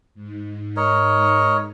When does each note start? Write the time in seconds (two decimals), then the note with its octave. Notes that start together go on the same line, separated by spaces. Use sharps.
0.15 G#2
0.76 A#4 C#5 D#5